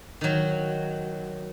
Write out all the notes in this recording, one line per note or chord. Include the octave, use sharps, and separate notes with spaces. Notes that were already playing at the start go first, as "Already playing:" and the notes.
D#3 F#3